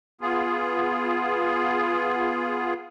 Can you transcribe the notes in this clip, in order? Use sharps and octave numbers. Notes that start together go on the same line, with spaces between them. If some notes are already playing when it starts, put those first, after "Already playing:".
B3 F4 G#4